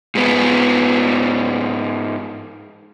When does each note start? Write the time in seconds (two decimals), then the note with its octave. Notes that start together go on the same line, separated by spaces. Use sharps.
0.15 G#2 B3